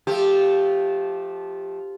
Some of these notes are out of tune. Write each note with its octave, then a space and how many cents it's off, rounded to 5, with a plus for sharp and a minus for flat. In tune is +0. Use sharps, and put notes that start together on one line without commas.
F3 +0 A3 -20 G4 +0